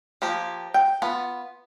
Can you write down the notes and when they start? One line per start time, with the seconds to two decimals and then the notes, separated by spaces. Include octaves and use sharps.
0.22 F3 A#3 G4
0.74 G5
1.02 B3 F4